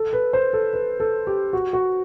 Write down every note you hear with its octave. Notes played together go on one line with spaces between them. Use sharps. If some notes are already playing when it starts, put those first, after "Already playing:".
Already playing: A4
B4
C5
A4
B4
A4
G4
F#4
F#4